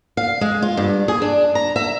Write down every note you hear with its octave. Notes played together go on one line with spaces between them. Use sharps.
F5
G#3
F4
G2
G#4
D4
A#5
E5